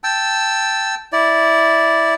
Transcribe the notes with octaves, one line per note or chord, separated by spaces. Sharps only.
G5 A5 E6
E4 D5